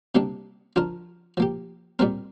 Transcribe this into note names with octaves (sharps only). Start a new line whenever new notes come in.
C3 G3 A#3 D4 G4
F3 D4 F4 A#4
F3 A#3 G4
A#2 G3 C4 A#4